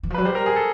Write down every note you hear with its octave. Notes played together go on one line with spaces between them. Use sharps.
E3
F3
F#3 B4
G3 C5
A#4
G#4
A4